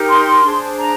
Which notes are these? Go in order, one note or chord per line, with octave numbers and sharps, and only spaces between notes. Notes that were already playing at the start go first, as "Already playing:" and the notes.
Already playing: D#4 G4 A#4
C6
D4 G#4 C5
A#5